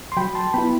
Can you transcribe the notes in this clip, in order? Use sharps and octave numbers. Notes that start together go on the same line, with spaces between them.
C6
F#3 G5 B5
A5 C6
B3 E4 G5 B5